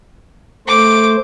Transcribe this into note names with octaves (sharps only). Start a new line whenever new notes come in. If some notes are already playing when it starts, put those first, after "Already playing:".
A3 C5 D6